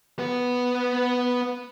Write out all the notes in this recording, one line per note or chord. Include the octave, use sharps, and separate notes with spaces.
B3 B4